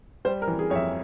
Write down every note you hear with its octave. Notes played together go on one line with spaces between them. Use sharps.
G3 C5
A#4
E3
G#4
F2 C#5
E5